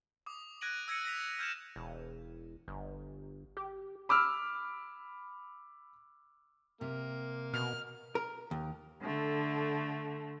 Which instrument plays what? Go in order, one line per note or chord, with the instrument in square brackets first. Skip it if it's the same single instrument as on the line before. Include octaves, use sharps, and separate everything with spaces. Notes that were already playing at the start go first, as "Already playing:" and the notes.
[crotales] D6 D#6
F#6 G#6 A#6 D7 D#7 F#7
E6 G#6 A#6 C#7 D#7
A#6 B6 F7
F6 G6 G#6 C#7 D#7 E7
[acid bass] E1
G1
G4
[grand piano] B5 D6 E6 F6
[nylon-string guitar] C3 [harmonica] A#3
[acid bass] B2 [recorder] F6
[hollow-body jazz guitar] A#4
D#2
[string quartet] D3 A3